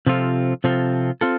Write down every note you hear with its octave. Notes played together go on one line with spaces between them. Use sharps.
C3 F3 C4 F4 A4
C3 F3 C4 F4 A4
C4 F4 A4